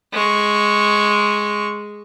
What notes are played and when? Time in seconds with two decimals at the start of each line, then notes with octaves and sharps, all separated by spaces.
0.13 G#3 C#6